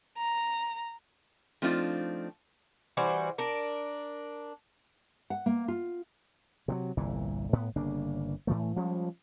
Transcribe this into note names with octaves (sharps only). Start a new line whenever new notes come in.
A#5
F3 A3 C4 D4 D#4 F4
E3 G3 F#4 C5
D4 A#4
F#5
A#3
F4
C3 E3 F#3
G1 C2 A#2 E3
A2 B3
G1 C#3 A#3 D4
A2 E3 A3
F3 G3 G#3 C#4